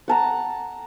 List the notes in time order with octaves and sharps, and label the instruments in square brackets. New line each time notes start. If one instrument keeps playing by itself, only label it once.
[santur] F#5 A5 A#5